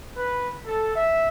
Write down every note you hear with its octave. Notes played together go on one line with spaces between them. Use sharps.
B4
A4
E5